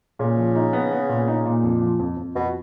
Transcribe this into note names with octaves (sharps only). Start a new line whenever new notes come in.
A#2 C#3
F3
D#4
B3
B3
A#2
D#4
A#2
F2
F3
F2
F2
F2 B2